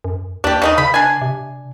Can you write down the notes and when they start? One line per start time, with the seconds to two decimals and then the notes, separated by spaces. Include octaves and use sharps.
0.04 F#2
0.44 D#2 D4 G4
0.62 C#3 D#4 G#4
0.78 C#3 B5
0.94 D4 G#5
1.22 C3